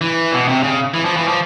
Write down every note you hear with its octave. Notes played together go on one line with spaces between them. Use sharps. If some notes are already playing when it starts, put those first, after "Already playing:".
E3
B2
C3
C#3
E3
F3
E3
F3